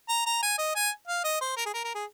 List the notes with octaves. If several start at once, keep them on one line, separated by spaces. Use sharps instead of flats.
A#5
A#5
G#5
D#5
G#5
F5
D#5
C5
A#4
G#4
A#4
A#4
G#4